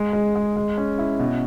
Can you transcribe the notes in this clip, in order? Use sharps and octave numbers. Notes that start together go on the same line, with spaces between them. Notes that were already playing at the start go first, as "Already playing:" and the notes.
Already playing: G#3
G#3
G#3
G#3
C#4
E4
B2